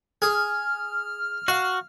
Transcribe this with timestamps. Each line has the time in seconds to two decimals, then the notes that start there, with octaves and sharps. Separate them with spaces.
0.22 G#4 F6
1.48 F#4 F5